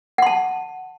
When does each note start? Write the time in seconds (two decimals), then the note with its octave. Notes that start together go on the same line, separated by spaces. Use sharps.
0.18 F#5
0.22 C6
0.27 A5